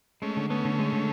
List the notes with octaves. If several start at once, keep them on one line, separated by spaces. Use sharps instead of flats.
G#3 A3 C#4
D3
A3 B3 C#4
D3
G#3
D3